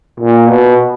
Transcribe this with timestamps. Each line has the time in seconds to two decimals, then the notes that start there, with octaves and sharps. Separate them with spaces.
0.20 A#2
0.49 B2